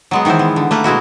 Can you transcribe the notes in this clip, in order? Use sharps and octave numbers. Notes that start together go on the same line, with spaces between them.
F#3 G#3 B3
D#3 E3 B3 E4 C5
B3
D3
A3 A#3 B4
B2 G#3 E4 F#4